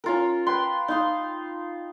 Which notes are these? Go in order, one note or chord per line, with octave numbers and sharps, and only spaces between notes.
C#4 F4 A#4
B4 G5 C6
D#4 F5 C6